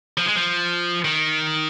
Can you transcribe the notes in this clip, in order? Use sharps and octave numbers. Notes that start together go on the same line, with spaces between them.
F3
G#3
F3
D#3